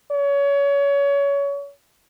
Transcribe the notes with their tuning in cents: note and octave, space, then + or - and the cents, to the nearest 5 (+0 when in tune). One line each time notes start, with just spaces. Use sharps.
C#5 +25